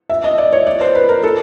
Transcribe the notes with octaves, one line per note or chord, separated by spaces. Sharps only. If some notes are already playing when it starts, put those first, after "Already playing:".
E5
D#5
D5
C#5
D5
C5
B4
A#4
A4